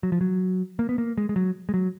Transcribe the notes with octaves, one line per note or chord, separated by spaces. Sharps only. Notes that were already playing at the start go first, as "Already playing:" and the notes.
F#3
F3
F#3
A#3
B3
A#3
G#3
G#3
F#3
G#3
F#3